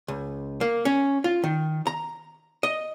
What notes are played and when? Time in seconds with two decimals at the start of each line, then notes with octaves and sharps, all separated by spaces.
0.08 C#2
0.61 A#3
0.85 C#4
1.24 F4
1.44 D#3
1.87 A#5
2.63 D#5